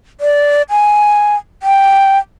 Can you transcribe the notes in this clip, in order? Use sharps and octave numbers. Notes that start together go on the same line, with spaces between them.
D5
G#5
G5